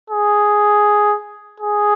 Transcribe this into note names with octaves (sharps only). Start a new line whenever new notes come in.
G#4
G#4